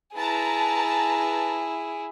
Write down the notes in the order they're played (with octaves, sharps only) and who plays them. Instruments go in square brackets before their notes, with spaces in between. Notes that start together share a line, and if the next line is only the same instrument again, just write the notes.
[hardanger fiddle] E4 G#4 [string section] B4 A5 A#5